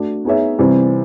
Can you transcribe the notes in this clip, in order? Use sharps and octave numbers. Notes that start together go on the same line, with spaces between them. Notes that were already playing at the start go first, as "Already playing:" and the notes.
Already playing: A3 D4 F#4
B3 D#4 G#4 C#5 E5
C3 E3 G3 C4